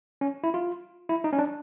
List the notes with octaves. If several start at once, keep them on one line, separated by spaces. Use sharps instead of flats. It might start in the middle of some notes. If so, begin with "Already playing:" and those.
C#4
E4
F4
E4
D#4
C#4
D4